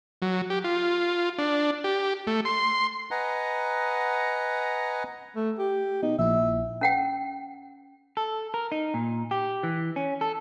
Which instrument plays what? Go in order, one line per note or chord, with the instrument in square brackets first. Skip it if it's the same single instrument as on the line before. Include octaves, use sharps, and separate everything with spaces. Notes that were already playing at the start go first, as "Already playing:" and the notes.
[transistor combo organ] F#3
G4
F4
D4
G4
A3
C6
[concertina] B4 D#5 F#5 G#5 A#5
[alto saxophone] A3
G4
[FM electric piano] B2 [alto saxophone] D#4
[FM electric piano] A#1 A#2 E4 [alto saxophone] E5
[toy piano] C#4 F#5 G5
[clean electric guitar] A4
A#4
D#4
A#2
G4
E3
C#4
A4